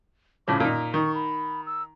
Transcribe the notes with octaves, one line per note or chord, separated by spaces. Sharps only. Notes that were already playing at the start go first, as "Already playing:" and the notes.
A2 C#3 F3 D6
A#2 D#4 A#5
D#3 C#6
B5
E6